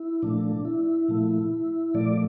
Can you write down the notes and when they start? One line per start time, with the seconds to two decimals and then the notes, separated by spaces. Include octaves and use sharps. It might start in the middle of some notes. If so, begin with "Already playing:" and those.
Already playing: E4
0.22 A#2 F3 A3 D4
0.65 E4
1.08 A#2 F3 A3
1.94 A#2 F3 A3 D5